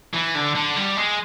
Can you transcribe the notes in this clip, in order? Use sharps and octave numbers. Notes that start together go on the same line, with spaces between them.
E3
D3
D3
G3
G#3